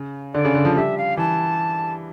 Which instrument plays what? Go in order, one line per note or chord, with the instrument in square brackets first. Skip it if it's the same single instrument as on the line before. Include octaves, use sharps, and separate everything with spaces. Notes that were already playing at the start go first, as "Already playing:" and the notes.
Already playing: [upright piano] C#3
[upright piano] D3 [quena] D5
[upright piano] C#3
D3
F3
[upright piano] G3 [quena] E5
[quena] F5
[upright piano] E3 [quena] A5